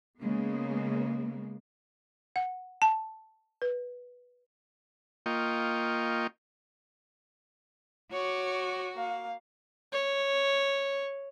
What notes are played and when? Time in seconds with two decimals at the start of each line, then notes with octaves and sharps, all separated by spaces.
0.20 C#3 G#3 A#3 B3
2.36 F#5
2.82 A5
3.62 B4
5.26 A#3 F4 D#5 G5 C#6
8.12 F#4 C#5 D6
8.95 A#3 F5
9.93 C#5